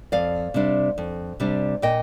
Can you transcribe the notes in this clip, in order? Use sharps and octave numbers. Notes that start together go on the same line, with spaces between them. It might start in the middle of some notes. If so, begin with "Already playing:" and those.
F2 D5 F5
C3 G3 D4
F2
C3 G3 D4
A#2 D#5 G5